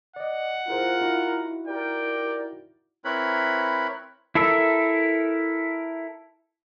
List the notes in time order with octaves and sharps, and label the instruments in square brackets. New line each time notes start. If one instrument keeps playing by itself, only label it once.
[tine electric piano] D5 D#5 [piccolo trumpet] F#5
[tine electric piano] E4 G#4 C5 [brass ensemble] F4 A#4
[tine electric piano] D#4 E4 F#4
[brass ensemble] G4 A#4 D5 [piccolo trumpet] G5
[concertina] C4 E4 A#4 B4 C#5 B5
[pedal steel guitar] E4 A4 A#4 E5